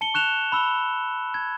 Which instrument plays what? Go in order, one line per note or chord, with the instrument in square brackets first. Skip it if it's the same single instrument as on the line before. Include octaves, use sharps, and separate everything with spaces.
[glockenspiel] A5 C#7 G7
C#6 F#6 E7 F7
B5 E6 G7
G#6